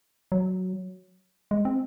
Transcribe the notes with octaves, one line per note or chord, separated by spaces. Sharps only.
F#3
G#3
C4